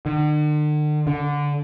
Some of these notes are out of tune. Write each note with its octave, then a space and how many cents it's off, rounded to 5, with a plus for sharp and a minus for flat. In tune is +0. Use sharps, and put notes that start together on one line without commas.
D3 +45
D3 -15